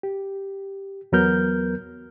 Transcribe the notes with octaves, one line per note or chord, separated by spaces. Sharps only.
G4
E2 F#3 B3 A#4 F6 G6